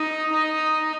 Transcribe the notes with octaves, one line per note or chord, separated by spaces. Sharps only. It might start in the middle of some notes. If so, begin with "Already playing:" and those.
Already playing: D#4
D#4